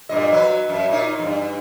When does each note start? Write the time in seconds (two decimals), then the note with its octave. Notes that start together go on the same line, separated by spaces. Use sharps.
0.09 G2 A#2 D#5
0.32 F#3 B4
0.69 F#2
0.90 A#2 D#4 C#5
1.19 E2 G2